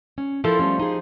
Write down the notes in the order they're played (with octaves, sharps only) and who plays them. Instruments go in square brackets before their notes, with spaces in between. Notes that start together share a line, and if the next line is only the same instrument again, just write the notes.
[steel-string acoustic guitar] C#4
[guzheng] F3 [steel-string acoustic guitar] E4 A4 A#4
[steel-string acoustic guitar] G3 A3 C#4
D#4 G4 G#4